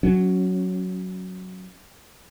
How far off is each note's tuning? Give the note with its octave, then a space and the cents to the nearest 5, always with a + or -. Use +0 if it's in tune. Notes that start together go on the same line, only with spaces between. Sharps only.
F#3 +0 C#4 +0